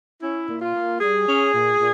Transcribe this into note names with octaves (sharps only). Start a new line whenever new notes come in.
C#4 E4
A#2
F4
A#3
G3 G#4
C#4
A#2
A#2